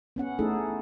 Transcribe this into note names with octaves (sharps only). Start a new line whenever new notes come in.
B3 C#4 F#5
A3 C#4 D#4 E4 G#4 A4